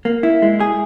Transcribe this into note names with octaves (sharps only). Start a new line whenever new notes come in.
A#3
E4
G#3
G#4